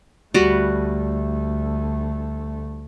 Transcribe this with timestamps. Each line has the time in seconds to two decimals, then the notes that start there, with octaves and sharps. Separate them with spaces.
0.34 D2 G3 A3 F#4 B4